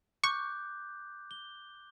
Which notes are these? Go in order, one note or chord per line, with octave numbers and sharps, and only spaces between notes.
C#6 D6 F#6 G6
G7